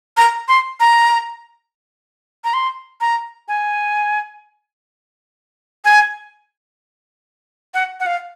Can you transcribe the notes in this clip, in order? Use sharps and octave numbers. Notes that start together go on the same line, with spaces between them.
A#5
C6
A#5
A#5
C6
A#5
G#5
G#5
F#5
F#5
F5